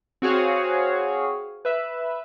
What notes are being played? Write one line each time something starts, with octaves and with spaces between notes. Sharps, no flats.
C4 F#4 G#4 C#5 F5
B4 E5